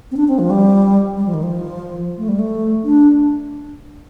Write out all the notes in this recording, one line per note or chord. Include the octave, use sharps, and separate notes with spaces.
C4
D4
C4
F3
G3
G3
F3
D#3
F3
A3
G3
A3
D4